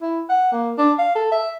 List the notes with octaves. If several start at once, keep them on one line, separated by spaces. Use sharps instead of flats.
E4
F#5
A#3
D4
F5
A4
E5